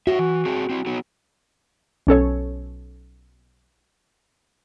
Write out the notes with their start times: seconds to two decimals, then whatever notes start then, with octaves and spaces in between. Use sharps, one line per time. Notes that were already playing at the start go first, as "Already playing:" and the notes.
0.07 F#4 C#5 E5
0.19 E3
0.45 C4 G#4 A5
0.69 C4 E4
0.86 F#3 B3 D#4
2.07 B1 C#4 A4 C#5